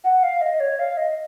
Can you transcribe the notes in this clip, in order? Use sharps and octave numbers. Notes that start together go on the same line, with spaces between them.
F#5
F5
D#5
C#5
F5
D#5